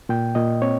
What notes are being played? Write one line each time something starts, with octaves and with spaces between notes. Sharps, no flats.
A#2 G5
A#2 D#5
C4 C#5